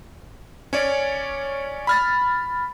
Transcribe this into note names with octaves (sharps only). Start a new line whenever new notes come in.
C#4 C#5 D5
B5 F6 A6